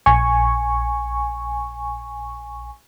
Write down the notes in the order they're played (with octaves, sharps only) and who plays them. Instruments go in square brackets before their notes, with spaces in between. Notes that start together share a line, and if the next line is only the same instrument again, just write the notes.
[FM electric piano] A#1 G#5 C#6